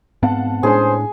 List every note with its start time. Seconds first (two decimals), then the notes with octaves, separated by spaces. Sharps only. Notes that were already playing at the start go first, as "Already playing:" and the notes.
0.23 G#2 B3 C4 F5 F#5 A5
0.63 A2 G#3 B3 C#4 D4 G#4 C5